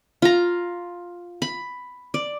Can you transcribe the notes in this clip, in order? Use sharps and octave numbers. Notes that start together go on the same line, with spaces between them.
F4 A#5
B5
D5